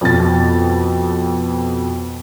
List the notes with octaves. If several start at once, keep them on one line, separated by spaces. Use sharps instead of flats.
F2 B2 A6